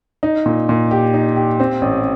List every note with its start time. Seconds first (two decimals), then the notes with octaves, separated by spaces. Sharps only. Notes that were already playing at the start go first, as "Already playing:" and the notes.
0.23 D#4
0.46 A#2
0.69 A#2
0.91 G4
1.14 D#4
1.36 G4
1.60 C4
1.82 A1